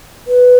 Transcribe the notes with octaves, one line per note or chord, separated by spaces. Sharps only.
B4